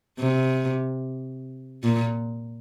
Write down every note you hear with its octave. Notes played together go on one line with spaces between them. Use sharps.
C3
A#2